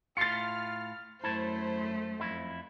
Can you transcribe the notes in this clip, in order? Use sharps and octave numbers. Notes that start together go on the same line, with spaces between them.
A2 F4 F6 A6 C7 C#7
F#2 A3 E4 C5 A5
F2 E4